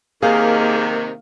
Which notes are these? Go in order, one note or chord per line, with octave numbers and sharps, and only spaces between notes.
C3 D#3 A#3 G#4 F5